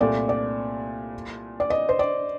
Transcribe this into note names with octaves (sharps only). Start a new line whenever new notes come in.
C2 A#2 A3 D5
D5
D5
D#5
C5
D5